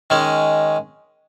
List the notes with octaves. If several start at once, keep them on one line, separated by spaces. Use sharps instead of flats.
D#3 G#3 C#4